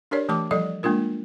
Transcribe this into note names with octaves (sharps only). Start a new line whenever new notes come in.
D4 G4 A#4 C#5 D5
E3 A3 G4 A5 D6
F3 G3 A4 D5 D#5
G#3 A#3 D4 F4 A#4